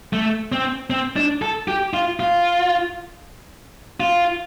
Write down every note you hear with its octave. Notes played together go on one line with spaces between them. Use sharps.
A3
C4
C4
D4
A4
G4
F4
F4
F4